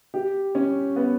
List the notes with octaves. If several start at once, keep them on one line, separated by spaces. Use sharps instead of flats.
G4
C#4
B3